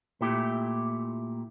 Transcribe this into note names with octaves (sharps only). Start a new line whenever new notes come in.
A#2 A3 E4 G4